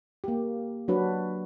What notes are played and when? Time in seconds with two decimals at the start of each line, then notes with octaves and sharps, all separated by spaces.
0.24 A#3 G4
0.88 F#3 D4 F#4 B4